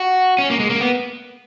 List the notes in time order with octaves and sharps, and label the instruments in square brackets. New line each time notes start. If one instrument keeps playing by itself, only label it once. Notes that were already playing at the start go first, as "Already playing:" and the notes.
Already playing: [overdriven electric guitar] F#4
C#4
A#3
G#3
A#3
B3